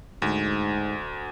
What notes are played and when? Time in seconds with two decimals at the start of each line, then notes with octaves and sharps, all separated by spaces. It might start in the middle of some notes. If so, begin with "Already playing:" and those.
0.22 D2 G#2